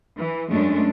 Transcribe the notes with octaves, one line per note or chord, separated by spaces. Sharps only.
E3
F#2 G#3 A3 C#4 D4